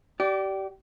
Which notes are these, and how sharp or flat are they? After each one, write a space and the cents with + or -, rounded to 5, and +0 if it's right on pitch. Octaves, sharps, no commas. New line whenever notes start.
G4 -30 D5 -5